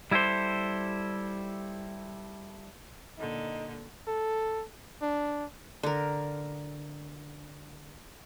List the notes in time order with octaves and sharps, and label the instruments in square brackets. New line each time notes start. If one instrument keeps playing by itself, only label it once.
[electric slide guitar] G3 E4 G4 A4 C5
[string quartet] A#2 D3 [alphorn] D#4
[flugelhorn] A4
D4
[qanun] D3 A#4